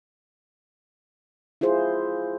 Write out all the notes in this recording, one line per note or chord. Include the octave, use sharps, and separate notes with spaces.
E4 F4 G#4 C5